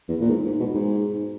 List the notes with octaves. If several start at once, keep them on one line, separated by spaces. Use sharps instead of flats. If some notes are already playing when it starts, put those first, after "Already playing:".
E2
A#2
G#2
G#2
B2
G#2